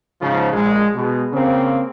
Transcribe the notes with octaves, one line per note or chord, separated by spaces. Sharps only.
G#2 C#3 F3
A#1 G#3
B2 G#3
C#3 A#3 C4